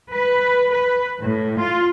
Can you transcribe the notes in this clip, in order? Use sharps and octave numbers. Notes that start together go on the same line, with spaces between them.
B4
B4
A2
F4